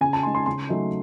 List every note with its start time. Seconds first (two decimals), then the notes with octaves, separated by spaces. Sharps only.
0.01 C#3 G#5
0.13 A5
0.23 G#3 D#4 C6
0.35 C6
0.46 C#3 C6
0.69 F#3 A3 D#4